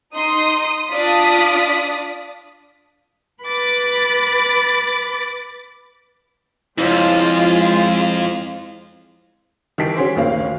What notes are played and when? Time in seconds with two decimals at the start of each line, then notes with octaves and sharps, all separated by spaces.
0.14 D#4 C6 D#6
0.90 D4 F4 D5 D#6 B6
3.43 B4 B5 D6 A6
6.78 F2 G#3 E4 F4 C5 C#5
9.78 D#3 E3 G3 B6 C7 D7
9.96 C#4 F#4 G#4 C5
10.15 D2 A#2 D#3 C#4 F5